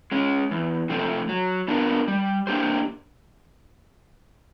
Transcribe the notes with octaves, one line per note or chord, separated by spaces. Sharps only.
G#3 C#4
E2
C3 F3 A3 C4
F#3
B3 D4 F4 A#4
G3
A#3 D4 G4 C5